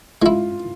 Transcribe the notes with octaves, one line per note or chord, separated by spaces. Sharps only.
G#3 E4 F4